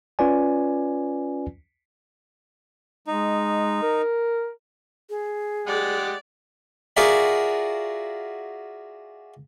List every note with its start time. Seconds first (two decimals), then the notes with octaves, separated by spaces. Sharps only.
0.19 C#4 F4 B4 D5 G#5
3.07 G#3 D#4
3.82 A#4
5.10 G#4
5.67 G#3 G4 D5 F#5
6.97 F4 F#4 G#4 A#4 D5 E5